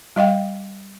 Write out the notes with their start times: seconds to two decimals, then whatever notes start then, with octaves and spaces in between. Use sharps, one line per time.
0.16 G3 D#5 F5 G5